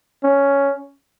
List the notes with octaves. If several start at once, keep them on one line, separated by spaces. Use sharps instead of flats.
C#4